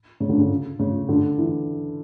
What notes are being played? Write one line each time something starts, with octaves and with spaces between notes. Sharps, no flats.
C#3
D3
C#3
C#3
D3
E3